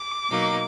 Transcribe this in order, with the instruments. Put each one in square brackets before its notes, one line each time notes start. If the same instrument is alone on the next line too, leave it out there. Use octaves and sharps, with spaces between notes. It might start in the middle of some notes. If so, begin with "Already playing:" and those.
Already playing: [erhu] D6
[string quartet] B2 F#3 A#3 D#4